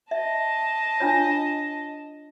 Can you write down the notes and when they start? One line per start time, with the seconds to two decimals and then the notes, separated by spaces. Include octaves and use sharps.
0.11 D#5 E5 A5
1.00 D4 F4 C#5